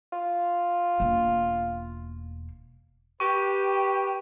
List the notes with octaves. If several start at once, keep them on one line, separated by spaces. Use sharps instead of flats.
F4
E1 A#3
G4 B4 G5 C#6